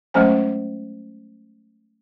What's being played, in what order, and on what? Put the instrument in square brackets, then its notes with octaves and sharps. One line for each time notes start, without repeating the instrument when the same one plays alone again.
[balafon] F#3 G#3 A3 C#4 C5 G#5